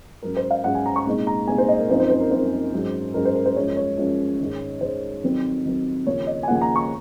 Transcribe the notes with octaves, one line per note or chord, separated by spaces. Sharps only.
G#2 F#3 C#4 A#4
C5
F5
G#2 F#3 C#4 F#5
G#5
A#5
C#6
C2 A#2 G#3 D#4
A#5
C2 A#2 G#3 D#4 G#5
C5
D#5
A#4
F#2 F3 C4 D#4 C5
C5
C5
A#4
F#2 F3 C4 D#4 C5
G#2 F#3 C#4
G#2 F#3 C#4 A#4
C5
A#4
C5
F#2 F3 G#3 C#4 C#5
C#5
F#2 F3 G#3 C#4
G#2 D#3 G#3
G#2 D#3 G#3 C5
F2 D#3 F#3 C4
F2 D#3 F#3 C4
D#2 C#3 F3 A#3 C#5
D#5
G#5
D#2 C#3 F3 A#3 F#5
G#5
A#5
C#6